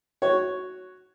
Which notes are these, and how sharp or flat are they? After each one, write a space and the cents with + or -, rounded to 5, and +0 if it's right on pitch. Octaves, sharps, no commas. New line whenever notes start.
F#4 +0 C#5 +0